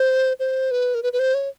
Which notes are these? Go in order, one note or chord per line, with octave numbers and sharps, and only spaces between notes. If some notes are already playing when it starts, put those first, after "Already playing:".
Already playing: C5
C5
B4
A#4
B4
B4
C5
C#5